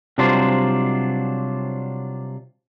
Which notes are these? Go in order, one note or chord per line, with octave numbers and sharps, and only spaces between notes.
C3 F#3 G3 D4 F4 C5